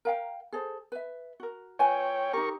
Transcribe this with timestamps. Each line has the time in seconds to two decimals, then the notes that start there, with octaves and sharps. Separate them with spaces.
0.05 A#4 F5 G5
0.53 G#4 A4 C5
0.92 B4 E5
1.40 F#4 A#4
1.79 F4 B4 C#5 G5 G#5
2.33 D#4 G4 A#4 C#6